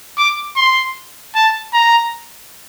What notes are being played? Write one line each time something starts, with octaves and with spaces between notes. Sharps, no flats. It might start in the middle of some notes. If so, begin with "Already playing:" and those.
D6
C6
A5
A#5